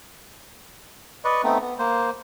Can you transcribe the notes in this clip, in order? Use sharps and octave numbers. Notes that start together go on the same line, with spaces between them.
B4 D5 D#5 C#6
A3 B3 C4 D#4
B3
A#3 C5